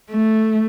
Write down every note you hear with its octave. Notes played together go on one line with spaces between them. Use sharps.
A3